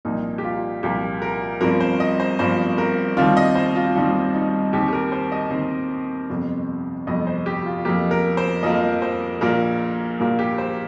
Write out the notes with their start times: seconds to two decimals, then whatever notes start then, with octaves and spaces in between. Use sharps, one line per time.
0.05 C2 A#2 F3 A#3 D#4
0.38 G4
0.44 F4
0.83 C2 A#2 F3 A#3 G4
1.22 A#4
1.61 G1 G2 F3 C4 A#4
1.80 C5
2.00 D#5
2.20 C5
2.39 G1 G2 F3 C4 C5
2.78 A#4
3.17 D#2 D#3 G3 C4 F4
3.37 D#5
3.55 C5
3.76 F4
3.95 D#2 D#3 G3 C4 F4
4.34 D#4
4.73 D#2 D#3 C4 G4
4.88 G4
4.93 A#4
5.12 C5
5.32 D#5
5.51 D#2 D#3 C4 C5
6.29 G1 F2 C3
7.07 G1 F2 C3 D#5
7.27 C5
7.46 G4
7.66 F4
7.85 F2 F3 A#3 G4
8.11 A#4
8.37 C5
8.63 F2 F3 A#3 D#5
9.02 C5
9.41 A#1 A#2 A#3 A#4
10.19 A#1 A#2 A#3
10.39 G4
10.58 C5